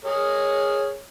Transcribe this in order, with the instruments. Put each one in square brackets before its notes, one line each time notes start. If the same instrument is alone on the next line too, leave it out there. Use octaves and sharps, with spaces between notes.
[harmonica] G#3 G#4 A#4 [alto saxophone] C#5